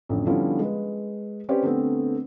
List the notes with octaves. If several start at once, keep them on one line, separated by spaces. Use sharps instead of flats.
A1 F2 D3
D3 F3 G3 B3 C#4 E4
G#3 B4
C4 C#4 G4 B4 C5 D5
D3 A3 B3 C4